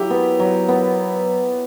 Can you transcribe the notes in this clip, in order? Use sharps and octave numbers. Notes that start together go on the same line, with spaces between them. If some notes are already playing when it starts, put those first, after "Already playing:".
Already playing: F#3 E4 G4
B3
F#3
B3